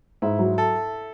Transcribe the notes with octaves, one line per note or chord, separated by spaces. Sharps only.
G#2 E4
F#3
A4